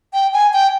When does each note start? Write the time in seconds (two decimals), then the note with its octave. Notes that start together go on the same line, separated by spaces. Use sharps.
0.14 G5
0.34 G#5
0.53 G5